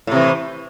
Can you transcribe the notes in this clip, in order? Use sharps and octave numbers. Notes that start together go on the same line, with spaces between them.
A2 C3 E3